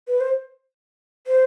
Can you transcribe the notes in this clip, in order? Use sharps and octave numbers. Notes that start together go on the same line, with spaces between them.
B4
C5
C5